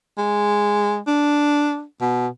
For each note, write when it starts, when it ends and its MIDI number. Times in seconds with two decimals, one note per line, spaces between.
0.18 1.00 56
1.08 1.84 62
2.01 2.28 47